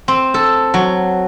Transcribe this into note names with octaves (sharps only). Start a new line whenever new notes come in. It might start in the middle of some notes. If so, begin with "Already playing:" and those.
C4
A4
F#3